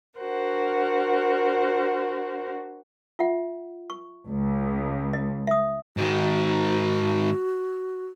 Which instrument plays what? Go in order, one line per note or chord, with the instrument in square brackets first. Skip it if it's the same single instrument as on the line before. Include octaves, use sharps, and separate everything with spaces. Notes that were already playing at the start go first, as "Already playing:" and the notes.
[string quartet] D4 F#4 A#4 C5 F#5
[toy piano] F4 E5 F#5
C#6
[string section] C#2
[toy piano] D#5
E5 D#6
[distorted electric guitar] G#2 D#3 [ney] F#4